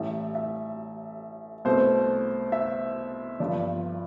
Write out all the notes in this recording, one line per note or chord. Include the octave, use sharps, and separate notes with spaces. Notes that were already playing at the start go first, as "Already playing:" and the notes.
Already playing: A1 A2 G3 E5
E5
C2 B2 A3 C5
E5
G1 G2 F3 D5